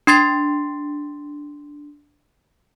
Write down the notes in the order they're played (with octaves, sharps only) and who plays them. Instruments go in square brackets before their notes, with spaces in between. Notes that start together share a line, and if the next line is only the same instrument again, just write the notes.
[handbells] D4 C6 A6 C7